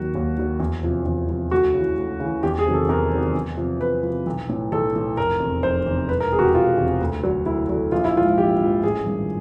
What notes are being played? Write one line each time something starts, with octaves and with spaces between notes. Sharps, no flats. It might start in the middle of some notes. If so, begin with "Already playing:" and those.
Already playing: D#2 D#3 F#3 F#4
D#2
D#3 F#3
E2
C3 F3
E2
C3 F3
D2 F#4
C#3 E3
D2
C#3 E3
E2 G4
G#4
C3 D#3 F#3
A4
E2 A#4
C3 D#3 F#3
E2
C3 F3
E2 B4
C3 F3
B1
A2 E3
B1 A4
A2 E3
F1 A#4
E2 C3
F1 C5
E2 C3
E1 B4
A#4
E2 C3 F#4 G#4
G4
E1 F4
E2 C3
D2
D3 F#3
D2 E4
D3 F#3
A#1 F4
E4
G#2 F3 F4
A#1 G4
G#2 F3
A1 G#4
G2 D#3